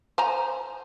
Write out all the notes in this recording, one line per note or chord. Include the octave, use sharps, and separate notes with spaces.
C5 G#5 A#5